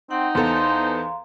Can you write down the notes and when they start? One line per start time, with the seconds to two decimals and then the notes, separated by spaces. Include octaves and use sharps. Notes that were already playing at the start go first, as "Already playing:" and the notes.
0.10 C4 D#4 F#5 G5
0.35 E2 B3 A4 C5 F5 A#5 C6